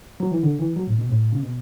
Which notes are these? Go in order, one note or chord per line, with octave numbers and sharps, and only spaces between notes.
F#3
E3
D3
E3
F#3
A2
B2
A2
C#3
B2